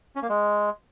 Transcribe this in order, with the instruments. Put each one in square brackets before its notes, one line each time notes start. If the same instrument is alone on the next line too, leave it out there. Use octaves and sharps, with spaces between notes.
[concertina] C#4
A#3
G#3